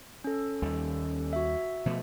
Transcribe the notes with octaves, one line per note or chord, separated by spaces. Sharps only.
C#4 A4
D#2 D#3 G3
F#4 E5
B2 F3 A3